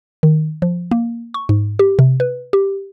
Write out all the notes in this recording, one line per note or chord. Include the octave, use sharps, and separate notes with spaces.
D#3
F3
A#3
C#6
G#2
G4
C3
B4
G4